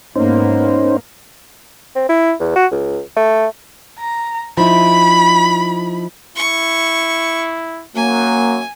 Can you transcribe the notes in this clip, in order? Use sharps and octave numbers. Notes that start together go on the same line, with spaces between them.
G#2 A#3 B3 C#4 D#4 C5
C4
E4
E2
F#4
C#2
A3
A#5
F3 D#4 E4 B5
E4 C#6
F#2 A#3 G#5